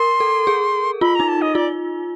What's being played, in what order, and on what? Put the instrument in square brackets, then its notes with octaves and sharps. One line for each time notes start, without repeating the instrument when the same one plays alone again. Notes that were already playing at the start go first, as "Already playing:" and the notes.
Already playing: [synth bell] A#4 [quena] C6
[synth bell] A4
G#4
[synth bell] F4 [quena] B5
[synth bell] D#4 [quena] A#5
[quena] A5
D#5
[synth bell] F4 [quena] D5